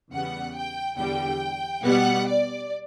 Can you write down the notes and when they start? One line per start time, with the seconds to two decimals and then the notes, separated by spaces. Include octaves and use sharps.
0.11 E2 C#3 G3 B3 F#5
0.55 G5
0.97 E2 D3 G3 G5
1.83 B2 G3 B3 F#5
2.27 D5